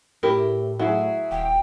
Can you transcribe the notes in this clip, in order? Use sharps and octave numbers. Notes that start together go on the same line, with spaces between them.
A2 E4 G4 A#4
F#3 E4 F#4 G#4
D#1 G5